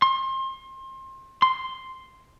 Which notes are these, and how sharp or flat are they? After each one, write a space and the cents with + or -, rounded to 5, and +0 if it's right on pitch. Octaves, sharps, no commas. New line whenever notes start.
C6 +30
C6 +0